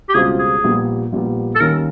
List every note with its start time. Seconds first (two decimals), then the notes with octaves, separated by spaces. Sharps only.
0.09 G4
0.14 C#2 B2 G3 C4 F4 G#4
0.39 G#4
0.64 A#1 A#2 G3 B3
1.12 A#1 A#2 G3 B3
1.55 A4
1.60 D#2 D#3 G3 A#3 C#4 A#4